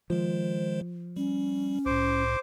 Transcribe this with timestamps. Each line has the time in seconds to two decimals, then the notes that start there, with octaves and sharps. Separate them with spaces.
0.10 D#3 F3 G#3 C5
1.16 G3 C#4
1.86 C2 A2 C5 D6